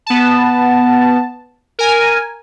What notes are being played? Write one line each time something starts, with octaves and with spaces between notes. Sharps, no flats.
B3 A5
A#4 G#5